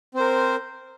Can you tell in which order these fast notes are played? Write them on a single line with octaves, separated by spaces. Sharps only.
C4 C5 A#4